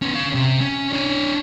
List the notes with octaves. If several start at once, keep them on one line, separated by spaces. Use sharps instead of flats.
B3 C#4
C#4 F5
C3
C#4
D4 C#5